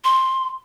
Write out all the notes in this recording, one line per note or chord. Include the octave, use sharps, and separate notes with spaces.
C6